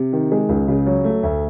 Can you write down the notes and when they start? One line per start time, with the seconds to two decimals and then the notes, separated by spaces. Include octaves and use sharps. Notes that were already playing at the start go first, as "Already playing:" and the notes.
Already playing: C3
0.13 D#3
0.32 G#3
0.49 C#2
0.68 C#3
0.86 F#3
1.04 A3
1.23 D2